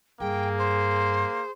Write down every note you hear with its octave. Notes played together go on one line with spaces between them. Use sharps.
G2 A#3 G#4 G5
C5